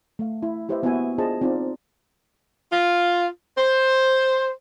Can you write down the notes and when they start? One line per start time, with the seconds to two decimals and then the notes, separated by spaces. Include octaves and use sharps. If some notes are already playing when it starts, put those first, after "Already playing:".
0.19 A3 F5
0.43 E4
0.69 E4 G4 B4 C5 D#5 E5
0.83 A#3 B3 E4 F#4 E5 G#5
1.18 D4 F4 G#4 C5 D#5 A5
1.41 C4 D#4 F4 D5
2.72 F4
3.57 C5